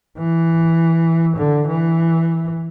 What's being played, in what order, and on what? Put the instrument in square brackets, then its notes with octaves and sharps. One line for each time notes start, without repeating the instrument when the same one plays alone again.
[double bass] E3
D3
E3